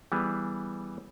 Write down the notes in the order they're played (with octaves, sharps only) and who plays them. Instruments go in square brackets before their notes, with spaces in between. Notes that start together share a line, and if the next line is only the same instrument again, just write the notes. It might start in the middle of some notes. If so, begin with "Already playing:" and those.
[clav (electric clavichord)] E3 G3 B3 G#4